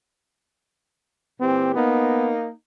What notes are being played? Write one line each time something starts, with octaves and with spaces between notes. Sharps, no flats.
A#2 E3 C4 G4
A#3 B3 D#4